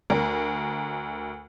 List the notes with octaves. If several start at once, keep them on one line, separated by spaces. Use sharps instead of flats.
D2 A#4